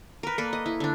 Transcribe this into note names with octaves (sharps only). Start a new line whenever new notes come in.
A#4 B4
A#3 A4 B4 D5
D#5
E4
D3 D4